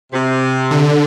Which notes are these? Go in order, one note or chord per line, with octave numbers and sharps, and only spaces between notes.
C3
D3